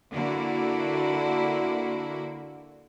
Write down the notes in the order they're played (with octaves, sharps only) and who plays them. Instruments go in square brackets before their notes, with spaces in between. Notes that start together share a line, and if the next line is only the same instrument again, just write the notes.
[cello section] D3 A#3 E4 F#4